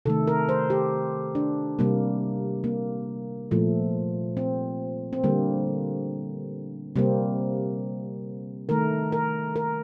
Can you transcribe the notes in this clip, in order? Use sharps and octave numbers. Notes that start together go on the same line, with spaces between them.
C3 D#3 A3 A4
A#4
C5
G4
D4
C3 G3 A#3
A#3
A#2 F3 A3
C4
C4
D3 G3 A#3
C3 G3 A#3 C4
D#3 A3 A#4
A#4
A#4